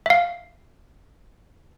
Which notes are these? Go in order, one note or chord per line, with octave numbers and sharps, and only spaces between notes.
E5 F5